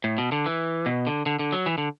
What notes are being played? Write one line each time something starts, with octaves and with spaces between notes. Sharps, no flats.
A2
B2
D3
E3
B2
D3
D3
D3
F#3
E3
D3